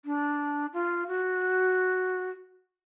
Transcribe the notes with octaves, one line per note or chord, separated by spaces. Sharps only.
D4
F4
F#4